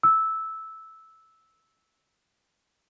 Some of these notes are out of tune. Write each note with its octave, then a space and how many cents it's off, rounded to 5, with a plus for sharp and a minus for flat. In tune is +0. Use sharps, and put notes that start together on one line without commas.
E6 -10